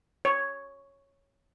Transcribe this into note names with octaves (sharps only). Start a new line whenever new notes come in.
C#5